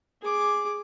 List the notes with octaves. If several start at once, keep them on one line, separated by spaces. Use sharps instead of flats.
G#4 D6